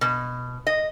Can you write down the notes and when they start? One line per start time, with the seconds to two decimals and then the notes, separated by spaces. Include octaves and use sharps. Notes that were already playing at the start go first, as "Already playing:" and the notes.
0.01 B2
0.67 D#5